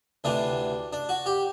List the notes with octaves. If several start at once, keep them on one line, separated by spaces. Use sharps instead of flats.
D2 C3 E3 D4
D4
F#4
G4